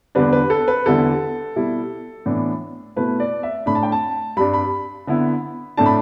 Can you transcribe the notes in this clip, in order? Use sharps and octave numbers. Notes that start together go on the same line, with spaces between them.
E2 D3 G3 D4 B4
B4
A4
B4
E2 D3 G3 E4 A4
B2 G3 E4
A2 E3 B3 D4
B2 A3 E4 B4
D5
E5
A2 A3 D4 B5
A5
G5
A5
G2 G3 D4 B5
B5
D3 B3 E4
A2 A3 D4 A5
B5